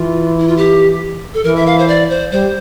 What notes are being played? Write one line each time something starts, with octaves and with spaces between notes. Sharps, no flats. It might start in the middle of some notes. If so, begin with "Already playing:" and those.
Already playing: E3 F4
E4
F4
G4
A4
E3 A#4
E5
F5
C5
D5
C5
G3 C5